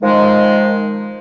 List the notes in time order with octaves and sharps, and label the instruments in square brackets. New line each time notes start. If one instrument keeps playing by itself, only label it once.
[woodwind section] D#3 F3 G#3